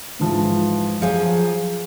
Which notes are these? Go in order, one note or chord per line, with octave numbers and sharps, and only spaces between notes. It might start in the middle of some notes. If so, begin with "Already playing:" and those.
G#2 E3 F3
F3 F#3 G#4 F5